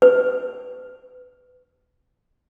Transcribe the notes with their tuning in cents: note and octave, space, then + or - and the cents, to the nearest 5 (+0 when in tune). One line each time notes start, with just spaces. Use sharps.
B4 +25